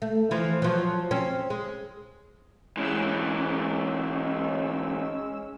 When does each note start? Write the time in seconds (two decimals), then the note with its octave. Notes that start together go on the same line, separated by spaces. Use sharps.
0.02 A3
0.31 E3 F3
0.62 F3 F#3
1.11 C4 C#4
1.50 G#3
2.77 G#2 E3 G#3 C#4 E6